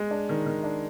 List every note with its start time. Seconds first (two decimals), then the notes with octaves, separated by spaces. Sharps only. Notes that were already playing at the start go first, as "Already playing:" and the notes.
Already playing: G#3
0.11 D4
0.29 D#3
0.46 D#3
0.64 D4